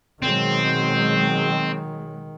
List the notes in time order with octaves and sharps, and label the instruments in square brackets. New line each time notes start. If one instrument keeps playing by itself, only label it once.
[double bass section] B2 F#3 G#3 [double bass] D#3 [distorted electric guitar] C4